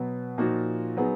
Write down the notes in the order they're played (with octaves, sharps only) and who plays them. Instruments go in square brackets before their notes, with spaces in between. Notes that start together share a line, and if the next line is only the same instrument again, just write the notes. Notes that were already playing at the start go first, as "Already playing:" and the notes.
Already playing: [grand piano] B2 F#3 B3
A#2 F3 A#3 D#4 F#4
F#3 B3 D#4 G#4